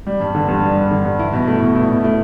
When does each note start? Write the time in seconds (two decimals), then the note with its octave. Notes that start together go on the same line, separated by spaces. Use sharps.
0.07 G3
0.20 G2
0.35 D3
0.48 G2
0.63 G3
0.77 G2
0.91 D3
1.05 G2
1.19 E4
1.33 B2
1.48 A3
1.61 B2
1.75 E4
1.90 B2
2.04 A3